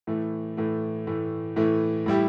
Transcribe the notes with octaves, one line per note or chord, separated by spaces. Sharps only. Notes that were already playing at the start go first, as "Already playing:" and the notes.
A2 E3 A3
A2 E3 A3
A2 E3 A3
A2 E3 A3
A2 G3 E4 G4